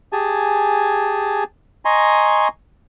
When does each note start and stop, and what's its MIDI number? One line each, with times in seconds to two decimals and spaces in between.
0.12 1.44 67
0.12 1.44 68
0.12 1.44 80
0.12 1.44 81
1.85 2.48 75
1.85 2.48 80
1.85 2.48 82
1.85 2.48 84
1.85 2.48 85